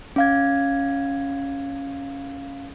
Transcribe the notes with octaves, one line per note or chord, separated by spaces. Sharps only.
C#4 F5 G#6